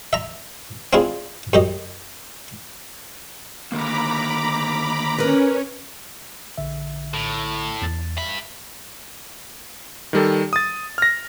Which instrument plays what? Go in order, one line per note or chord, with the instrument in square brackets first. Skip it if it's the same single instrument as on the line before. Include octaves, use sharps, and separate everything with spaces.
[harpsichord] E5 A#5
C4 D4 E4 F4 G#4
F#2 G4 D#5
[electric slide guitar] D3 D#3 A#3 [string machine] A#5 B5 D6
[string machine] C#4 [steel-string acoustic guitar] A#4 B4
[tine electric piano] A#1 D3 E5
[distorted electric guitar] A2
[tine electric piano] E2 A6
[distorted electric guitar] G2 B5 [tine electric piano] E5
[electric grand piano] D#3 G3 A4
D#6 A6
F6 A#6